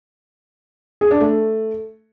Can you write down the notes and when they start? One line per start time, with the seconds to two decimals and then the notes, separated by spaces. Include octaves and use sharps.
1.01 G#4
1.11 D4
1.20 A3